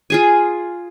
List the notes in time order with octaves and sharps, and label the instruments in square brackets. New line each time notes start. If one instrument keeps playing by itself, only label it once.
[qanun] F4 G#4 G#5